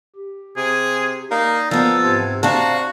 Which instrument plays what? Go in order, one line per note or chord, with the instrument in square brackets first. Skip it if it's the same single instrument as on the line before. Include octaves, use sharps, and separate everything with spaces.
[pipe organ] G4
[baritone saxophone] C3 [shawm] G#4
[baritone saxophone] A#3 [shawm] D#4 [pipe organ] D5
[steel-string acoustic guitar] F3 B3 [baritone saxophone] A#3 [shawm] A4
[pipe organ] G#2 G4 G#6 [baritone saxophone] C3
[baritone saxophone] C3 [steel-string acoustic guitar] D4 F5 A5 [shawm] F#4 [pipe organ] A#5